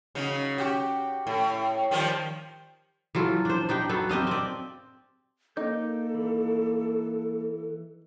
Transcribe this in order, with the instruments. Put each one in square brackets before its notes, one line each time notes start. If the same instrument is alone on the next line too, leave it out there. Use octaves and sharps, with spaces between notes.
[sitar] C#3 F#3 D#4
F#4 G4
A2
D#3 F3 G3
[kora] E3 F#3 F4 A4
D4 C5
D4 D#4 G4 G5
F#3 B3 A4
C4 G4 D#5 F5
C4 D5
[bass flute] A#3 [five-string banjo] D#4 [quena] A4 [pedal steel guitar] A#4 D6 G6
[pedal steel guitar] E3